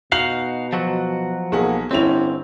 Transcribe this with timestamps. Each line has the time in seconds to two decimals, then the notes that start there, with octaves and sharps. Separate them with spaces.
0.12 B2 D#4 F#4 F5 F#7
0.73 F3 F#3 F#4
1.52 B1 A#3 G#4 F#5
1.91 G1 C4 C#4 E4 F7